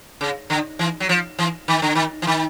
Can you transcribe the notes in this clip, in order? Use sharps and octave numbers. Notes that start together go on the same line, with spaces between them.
C#3
D3
E3
F#3
F3
E3
D#3
D3
D#3
E3
D#3